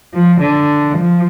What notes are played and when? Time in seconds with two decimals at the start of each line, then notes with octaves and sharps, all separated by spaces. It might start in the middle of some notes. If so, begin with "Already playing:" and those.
0.13 F3
0.41 D3
0.98 F3